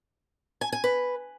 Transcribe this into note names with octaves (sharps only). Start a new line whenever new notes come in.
G#5
G#5
B4